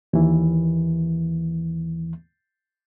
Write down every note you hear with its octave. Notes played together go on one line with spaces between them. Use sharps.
D#2 E3